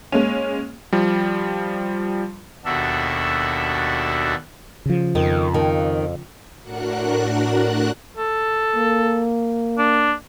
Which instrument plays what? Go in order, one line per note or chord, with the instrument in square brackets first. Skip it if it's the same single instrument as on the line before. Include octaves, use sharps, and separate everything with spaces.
[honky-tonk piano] G#3 A#3 C#4
[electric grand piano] F3 G3
[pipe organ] D#2 B2 D4 F#4 A4 E5
[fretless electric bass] C#3 F3
[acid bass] F2 [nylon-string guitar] D#3
[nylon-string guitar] D#3
[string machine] A2 D4 F#4 A#4 F#5 F#6
[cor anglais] A4
[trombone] A#3
[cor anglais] D4